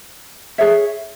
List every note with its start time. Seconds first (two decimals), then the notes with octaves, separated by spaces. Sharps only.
0.58 G#4 C#5 E5